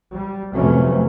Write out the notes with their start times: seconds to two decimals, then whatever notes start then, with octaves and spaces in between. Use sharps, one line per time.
0.12 G3
0.54 F2 C3 E3 F#3 A3 C#4